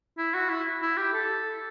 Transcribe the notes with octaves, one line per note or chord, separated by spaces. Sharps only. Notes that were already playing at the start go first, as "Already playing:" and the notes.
E4
F#4
E4
E4
G4
A4